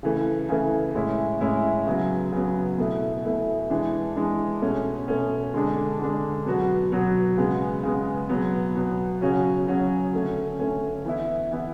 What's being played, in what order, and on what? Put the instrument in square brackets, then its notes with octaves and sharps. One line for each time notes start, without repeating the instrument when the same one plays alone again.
[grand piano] C#3 E3 A3
C#3 E3 A3
A2 G#3 C#4 E4
A2 G#3 C#4 E4
C#3 F#3 B3
C#3 F#3 B3
B2 A3 E4
B2 A3 E4
E3 G#3 D4
E3 G#3 D4
B2 A3 C#4
B2 A3 C#4
D3 G#3 D4
D3 G#3 D4
B2 F#3 B3 F#4
B2 F#3 B3 F#4
C#3 G#3 B3
C#3 G#3 B3
B2 F#3 B3
B2 F#3 B3
C#3 F#3 C#4 F#4
C#3 F#3 C#4 F#4
D3 A3 C#4
D3 A3 C#4
E3 B3 E4
E3 B3 E4